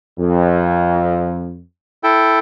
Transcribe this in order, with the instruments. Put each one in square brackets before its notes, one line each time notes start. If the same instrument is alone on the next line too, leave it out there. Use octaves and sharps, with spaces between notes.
[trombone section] F2
[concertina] E4 A4 G5